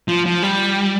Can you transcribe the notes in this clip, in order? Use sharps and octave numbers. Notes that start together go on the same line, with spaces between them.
F3
F3
G3